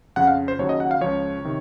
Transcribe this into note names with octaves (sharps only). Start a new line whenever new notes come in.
F2 C#3 F3 F#5
F5
C5
D#2 C#3 F#3 C#5
D#5
F#5
F5
C#2 C#3 F3 C#5
C3 D#3